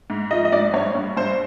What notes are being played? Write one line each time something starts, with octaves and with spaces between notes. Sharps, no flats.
G#2
F3 D#5
D#5
G#2 D5
G2 C#5
G2
G2 C5